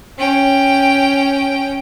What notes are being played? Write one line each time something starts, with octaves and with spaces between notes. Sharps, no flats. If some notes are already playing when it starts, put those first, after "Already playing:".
C#4 G5